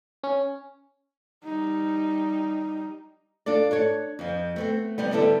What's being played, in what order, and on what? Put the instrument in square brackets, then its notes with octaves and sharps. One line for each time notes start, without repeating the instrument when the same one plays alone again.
[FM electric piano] C#4
[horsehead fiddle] G3 D#4
[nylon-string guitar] D4 F4 A4 D5
D4 A4 C#5
F2 F3
A3 B3 C4
C3 G3 B3
D3 G3 B3 E4 A4